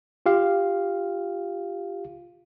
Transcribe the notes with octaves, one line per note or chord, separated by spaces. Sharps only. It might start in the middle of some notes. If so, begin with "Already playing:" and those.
F4 G4 F5